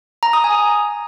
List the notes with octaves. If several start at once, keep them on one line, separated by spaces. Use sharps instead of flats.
A#5
D#6
G#5